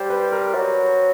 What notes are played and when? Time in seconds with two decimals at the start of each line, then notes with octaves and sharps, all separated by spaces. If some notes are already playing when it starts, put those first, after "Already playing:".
Already playing: G3 C5
0.10 B4
0.32 A#4
0.54 F#3